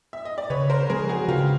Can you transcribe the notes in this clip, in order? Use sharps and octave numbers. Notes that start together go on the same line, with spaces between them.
E5
D#5
D5
C#3 B4 C#5
A#4 C5
F3 G#3 C4 G#4 A#4
F#4 G#4
C#3 F4 G4